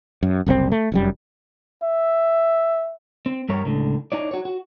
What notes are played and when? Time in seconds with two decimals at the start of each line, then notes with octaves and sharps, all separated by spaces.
0.23 F#2
0.46 F#1 C2 A2 C4
0.72 A3
0.92 F1 F#2 G3
1.83 E5
3.26 C4
3.49 G2 G3 A#4 C#5
3.65 C#2 A2 D3
4.12 D#4 E4 C#5 D5
4.31 F#4 C#5
4.45 F#4